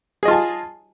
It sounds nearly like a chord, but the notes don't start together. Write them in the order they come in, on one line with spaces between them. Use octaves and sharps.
G#4 D#5 F4 A5 G#5